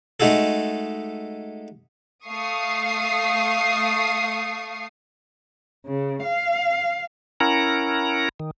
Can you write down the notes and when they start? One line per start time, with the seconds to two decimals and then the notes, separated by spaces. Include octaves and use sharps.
0.20 G#3 A3 D#4 F#4 G#4 A4
2.26 A3 F5 C#6 D#6 C7
5.86 C#3
6.23 F5
7.40 C#4 E4 A#4 F#5 A#5
8.40 D#3